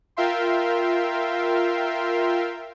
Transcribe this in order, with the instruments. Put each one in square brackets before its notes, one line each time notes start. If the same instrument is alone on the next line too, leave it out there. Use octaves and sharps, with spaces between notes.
[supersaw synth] F4 A#4 E5 F5 G5 C6